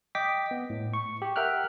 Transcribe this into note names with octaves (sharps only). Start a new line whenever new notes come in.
D#5 G5 D6 B6
B3
A2
C#6
G4
A#4 E5 F#5 G5 F6 F#6